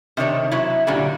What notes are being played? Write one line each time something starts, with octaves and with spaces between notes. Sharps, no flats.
C3 D#3 D4 C#5
C3 F#3 E4
A#2 D3 F#3 G3